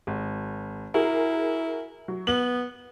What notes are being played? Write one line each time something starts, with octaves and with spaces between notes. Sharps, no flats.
G#1
E4 F#4 G#4 A#4
F#3
B3 F#7